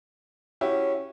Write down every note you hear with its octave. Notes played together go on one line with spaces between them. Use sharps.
C#4 E4 F#4 G4